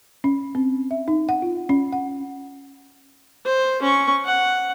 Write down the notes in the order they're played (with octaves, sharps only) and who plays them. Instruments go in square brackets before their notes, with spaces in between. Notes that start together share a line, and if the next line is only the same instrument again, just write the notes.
[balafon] C#4
C4
E5
D#4
F#5
F4
C#4
F#5
[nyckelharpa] C5
C#4 C#6
F#5